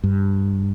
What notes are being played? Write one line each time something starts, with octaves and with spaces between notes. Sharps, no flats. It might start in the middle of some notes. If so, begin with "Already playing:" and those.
G2